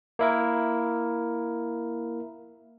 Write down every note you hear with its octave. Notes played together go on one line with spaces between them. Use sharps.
A#3 E4 A#4